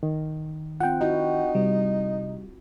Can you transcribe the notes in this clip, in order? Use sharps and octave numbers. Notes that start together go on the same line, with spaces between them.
D#3
C4 F4 F#5 G5
D#4 E4 F#4
C3 G3